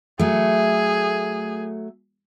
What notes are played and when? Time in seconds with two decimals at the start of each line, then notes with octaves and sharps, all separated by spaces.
0.19 F#3 A3 G#4